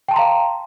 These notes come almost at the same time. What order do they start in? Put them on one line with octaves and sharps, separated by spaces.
G5 A5 C6 A#5 F5